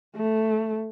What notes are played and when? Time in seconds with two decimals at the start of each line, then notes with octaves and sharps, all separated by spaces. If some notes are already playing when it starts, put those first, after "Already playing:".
0.16 A3